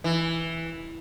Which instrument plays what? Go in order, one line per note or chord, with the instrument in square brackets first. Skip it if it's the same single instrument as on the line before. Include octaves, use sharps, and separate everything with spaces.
[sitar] E3